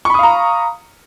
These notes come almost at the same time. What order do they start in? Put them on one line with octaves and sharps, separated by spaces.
C#6 B5 D#6 F5 A#5